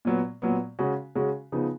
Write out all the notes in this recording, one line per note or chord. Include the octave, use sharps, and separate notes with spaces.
A#2 F#3 B3
A#2 F#3 B3
C#3 G#3 C#4 F#4
C#3 G#3 C#4 F#4
C#3 F3 B3 D#4